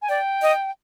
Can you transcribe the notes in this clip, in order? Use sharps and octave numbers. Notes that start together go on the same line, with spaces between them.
G#5
D5 G5
D#5